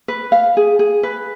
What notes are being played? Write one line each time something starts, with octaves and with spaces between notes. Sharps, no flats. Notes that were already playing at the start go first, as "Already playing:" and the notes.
B4
F5
G#4
G#4
B4